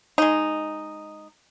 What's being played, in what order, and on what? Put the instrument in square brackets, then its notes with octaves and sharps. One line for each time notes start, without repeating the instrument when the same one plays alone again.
[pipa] G#3 D#4